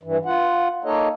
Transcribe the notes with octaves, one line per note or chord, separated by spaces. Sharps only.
G2 E3
F4 F#5
A#3 D#4 A4 C#5 D#5